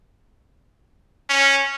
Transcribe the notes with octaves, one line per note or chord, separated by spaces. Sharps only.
C#4